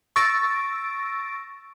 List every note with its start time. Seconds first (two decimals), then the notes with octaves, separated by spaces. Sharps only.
0.16 C#6 E6 A6 A#6 D7